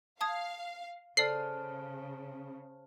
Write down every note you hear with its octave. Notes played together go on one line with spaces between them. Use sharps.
F5 A5 D#6 G#6
C#3 A4 C5 D5 A5 F6 C7